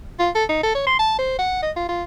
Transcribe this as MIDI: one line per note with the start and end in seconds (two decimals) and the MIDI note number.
0.20 0.30 65
0.35 0.44 69
0.49 0.63 63
0.64 0.74 69
0.75 0.85 73
0.87 0.98 84
1.00 1.14 81
1.19 1.37 72
1.39 1.61 78
1.63 1.71 75
1.76 1.87 65
1.89 2.03 65